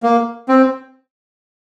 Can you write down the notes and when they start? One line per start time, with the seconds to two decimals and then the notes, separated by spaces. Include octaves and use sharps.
0.03 A#3
0.49 C4